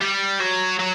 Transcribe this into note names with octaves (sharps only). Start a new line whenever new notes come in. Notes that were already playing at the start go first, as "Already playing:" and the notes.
G3
F#3
F#3